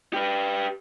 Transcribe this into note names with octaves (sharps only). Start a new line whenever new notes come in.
G4 B4